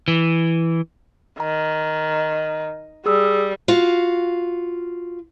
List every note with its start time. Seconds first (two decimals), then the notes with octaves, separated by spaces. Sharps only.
0.08 E3
1.40 D#3 A#5
3.06 G3 G#4 D#6 E6
3.68 F4 F#4 F5